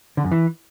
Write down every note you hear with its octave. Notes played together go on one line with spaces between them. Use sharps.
D3
F#2
E3